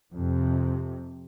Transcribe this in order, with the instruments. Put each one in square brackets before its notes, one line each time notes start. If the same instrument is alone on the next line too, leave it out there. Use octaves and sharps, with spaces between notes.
[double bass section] F2 C3